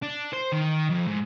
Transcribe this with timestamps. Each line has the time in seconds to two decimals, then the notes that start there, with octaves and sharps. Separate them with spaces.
0.03 D4
0.33 C5
0.52 D#3
0.90 F2
1.08 G#2